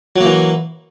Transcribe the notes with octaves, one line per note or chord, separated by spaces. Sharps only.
E3 F#3 A#3